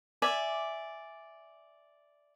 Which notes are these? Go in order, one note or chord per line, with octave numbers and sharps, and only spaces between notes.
D5 E5 G#5